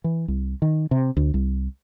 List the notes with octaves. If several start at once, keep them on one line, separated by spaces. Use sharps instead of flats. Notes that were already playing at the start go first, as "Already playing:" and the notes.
E3
C2
D#3
C3
D2
C2